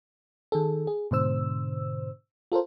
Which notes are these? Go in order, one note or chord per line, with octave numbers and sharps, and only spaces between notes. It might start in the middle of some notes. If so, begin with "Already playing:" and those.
D#3 G#4 A4
G#4
G#2 B2 D3 C5 E6
F4 A4 A#4 C5